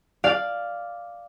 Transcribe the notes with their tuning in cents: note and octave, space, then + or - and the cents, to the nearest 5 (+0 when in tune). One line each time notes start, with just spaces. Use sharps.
D5 +0 F5 +0